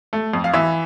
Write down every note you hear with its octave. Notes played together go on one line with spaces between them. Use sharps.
A3
F2
F5
E3 E5